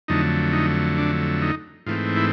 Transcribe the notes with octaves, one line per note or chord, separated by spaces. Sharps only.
F2 D3 F#3 A3 D#4
D#4
D4
D#4
G#2 E3 A3 C4 F4
E4